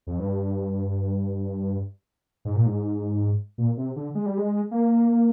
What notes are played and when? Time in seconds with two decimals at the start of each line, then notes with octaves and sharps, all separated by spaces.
0.07 F2
0.19 G2
2.45 G#2
2.55 A#2
2.66 G#2
3.58 A#2
3.77 C3
3.96 D3
4.15 G#3
4.26 G3
4.38 G#3
4.71 A#3